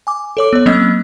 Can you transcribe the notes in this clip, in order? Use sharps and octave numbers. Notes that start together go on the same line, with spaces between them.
G#5 D6
A4 C#5 D6
B3 C#5
F#3 A#3 C4 C#4 D#5 E6